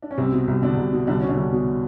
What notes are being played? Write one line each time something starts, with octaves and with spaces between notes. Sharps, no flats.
D4
C#4
C2 C3 C4
B2
C2
B2 D3 D4
C2
B2
C2 D3 D4
B2 C#4
D3 D4
C2
B2